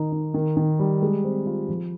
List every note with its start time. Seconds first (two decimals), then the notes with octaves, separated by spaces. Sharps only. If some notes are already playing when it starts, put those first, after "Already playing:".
Already playing: D#3 D#4
0.12 D#4
0.34 D#3
0.57 D#3
0.79 G3
1.02 G#3
1.24 C4
1.46 F4
1.69 F3